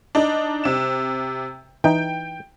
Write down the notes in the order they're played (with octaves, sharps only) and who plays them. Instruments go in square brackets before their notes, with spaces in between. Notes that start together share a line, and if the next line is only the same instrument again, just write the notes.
[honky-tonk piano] D4 D#4
C3 E7
[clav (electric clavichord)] E3 D#4 [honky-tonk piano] G5